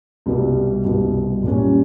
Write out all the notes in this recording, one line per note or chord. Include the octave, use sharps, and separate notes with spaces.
C2 B2 G3
C2 B2 G3
A#2 G3 A#3 C#4